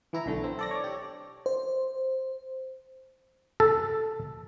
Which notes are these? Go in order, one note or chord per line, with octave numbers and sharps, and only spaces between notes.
E3 E4 A#5
B1 D3 A3
C4
A4 D5 A#6
C#5 D5
G4
C5
A4